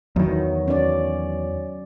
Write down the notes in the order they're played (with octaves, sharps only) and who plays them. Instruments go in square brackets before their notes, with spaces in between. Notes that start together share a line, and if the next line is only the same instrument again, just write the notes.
[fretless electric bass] E2 D#3 [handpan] F#3
[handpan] C#4 D5